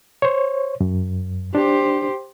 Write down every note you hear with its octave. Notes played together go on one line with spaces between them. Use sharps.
C5 C#5
F#2
D4 G4 C5